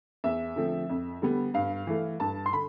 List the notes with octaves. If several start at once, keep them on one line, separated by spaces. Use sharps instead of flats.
E2 E5
D3 F3 A3 C4
F2
D3 G3 B3
G2 F5
E3 A3
G2 A5
C6
D3 B5